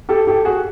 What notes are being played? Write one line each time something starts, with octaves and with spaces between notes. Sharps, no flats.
G4 A4
G4 A4
F#4 G#4